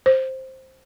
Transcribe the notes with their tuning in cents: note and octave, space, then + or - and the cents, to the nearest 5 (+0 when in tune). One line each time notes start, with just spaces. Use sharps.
C5 +5